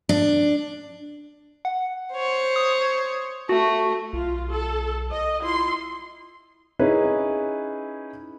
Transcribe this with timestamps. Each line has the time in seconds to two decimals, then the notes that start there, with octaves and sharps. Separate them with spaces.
0.09 D4
1.65 F#5
2.13 C5 C#5
2.56 D#6
3.49 A3 F#4
4.13 B1 F4
4.51 A4
5.12 D#5
5.41 E4 F4 C6
6.79 C#4 D#4 E4 G#4 B4